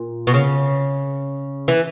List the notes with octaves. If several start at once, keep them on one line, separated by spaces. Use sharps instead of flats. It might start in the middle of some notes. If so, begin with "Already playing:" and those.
Already playing: A#2
B2
C#3
E3